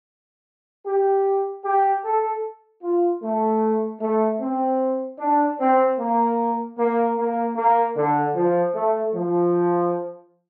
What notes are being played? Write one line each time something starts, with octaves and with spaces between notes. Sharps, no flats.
G4
G4
A4
F4
A3
A3
C4
D4
C4
A#3
A#3
A#3
A#3
D3
F3
A3
F3